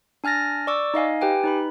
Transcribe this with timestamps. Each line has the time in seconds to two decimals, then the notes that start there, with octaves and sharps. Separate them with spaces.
0.24 D4 G#5 F6 A6 A#6
0.67 D5 C#6 D6 E6
0.94 D#4 D#5 F5 G#5
1.21 G4 B4 G5 G#5
1.44 D#4 B4 B5